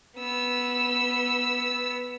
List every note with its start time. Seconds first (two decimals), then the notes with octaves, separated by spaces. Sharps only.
0.17 B3 E6